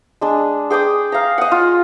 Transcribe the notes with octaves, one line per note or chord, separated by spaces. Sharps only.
G#3 D4
G#4 G5 D6 D#6
F5 A#5
D#5 F#5
F4